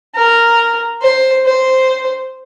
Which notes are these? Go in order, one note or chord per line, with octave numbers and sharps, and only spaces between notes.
A#4
C5
C5